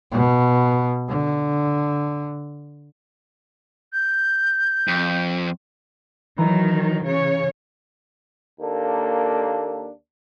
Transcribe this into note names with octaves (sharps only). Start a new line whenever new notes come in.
B2
D3
G6
F2
D#3 E3 F#3 A#5 D#7
C#3 C#5
D#2 A#3 D4 A4